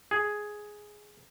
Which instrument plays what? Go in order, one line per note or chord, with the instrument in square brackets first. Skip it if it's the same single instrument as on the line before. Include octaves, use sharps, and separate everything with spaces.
[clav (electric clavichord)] G#4